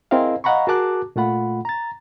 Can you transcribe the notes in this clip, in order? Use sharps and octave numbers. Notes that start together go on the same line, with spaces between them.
C4 E4 G#4 A#4 D#5 F5
D#5 F5 F#5 A#5 B5 C#6
F#4 G#4 A#4 A5 D6 F#6
A#2 A3 F4 F#5 B5
A#5 A6